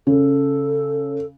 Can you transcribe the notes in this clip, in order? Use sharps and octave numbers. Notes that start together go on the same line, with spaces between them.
C#3 A4